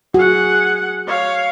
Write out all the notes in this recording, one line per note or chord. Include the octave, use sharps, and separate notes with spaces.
F#4 G#4 F#5
C#5 F5